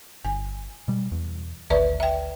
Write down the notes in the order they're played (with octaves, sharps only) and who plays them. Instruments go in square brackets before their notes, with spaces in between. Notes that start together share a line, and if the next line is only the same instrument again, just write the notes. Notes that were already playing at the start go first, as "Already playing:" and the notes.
[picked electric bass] G1 [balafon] G#5
[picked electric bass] B2 G3
E2
[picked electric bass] G#1 D2 [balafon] B4 D5 E5
[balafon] E5 G5